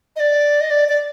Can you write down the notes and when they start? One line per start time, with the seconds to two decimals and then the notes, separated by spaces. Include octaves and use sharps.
0.16 D#5
0.20 D5
0.61 D#5
0.70 D5
0.89 D5